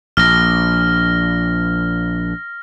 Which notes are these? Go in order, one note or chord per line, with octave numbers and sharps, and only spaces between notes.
A#1 F6 A#6